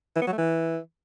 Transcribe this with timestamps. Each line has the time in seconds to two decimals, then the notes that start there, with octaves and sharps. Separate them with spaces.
0.16 E3
0.21 B3
0.27 F#3
0.32 A3
0.38 E3